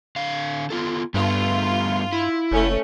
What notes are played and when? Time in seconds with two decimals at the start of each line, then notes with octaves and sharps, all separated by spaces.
0.16 D3 F5
0.70 B3 F4 A4
1.14 G2 G3 A3 B3 F4
2.12 E4
2.52 F#1 A3 C#4